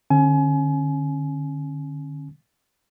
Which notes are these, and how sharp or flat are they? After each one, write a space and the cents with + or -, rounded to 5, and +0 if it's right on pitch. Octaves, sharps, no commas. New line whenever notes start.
D3 +25 C#4 -30 G#5 +30